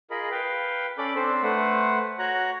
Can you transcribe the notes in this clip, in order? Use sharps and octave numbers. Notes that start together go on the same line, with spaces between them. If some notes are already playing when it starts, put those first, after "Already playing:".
F4 G#4 A#4 D#5 B5
B4 F5 G5
C#4 A4 D5 B5 D6
C4 D4 A4 C5
A3 B4 C5 F#5
F#4 C#5 A#5 F#6